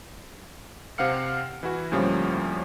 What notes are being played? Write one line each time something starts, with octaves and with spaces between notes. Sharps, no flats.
C3 C4 F5 F#5 F6 C#7
E3 E4 F#4
D2 A2 F3 G3 A#3 C#4